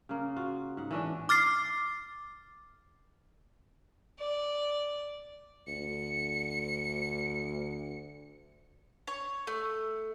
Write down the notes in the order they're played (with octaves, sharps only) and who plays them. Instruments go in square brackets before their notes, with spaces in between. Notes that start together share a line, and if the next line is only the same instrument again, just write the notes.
[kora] C#3 A#3
F4 F#4
G#2 F#5
E3 C#4 D4
[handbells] D6 F6 A6 C7
[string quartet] D5
[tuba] D2 [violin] C#7
[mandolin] C#5
A3